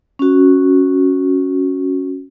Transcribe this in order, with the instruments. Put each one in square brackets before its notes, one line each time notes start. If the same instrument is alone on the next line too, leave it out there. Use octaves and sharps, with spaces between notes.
[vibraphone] C#4 F#4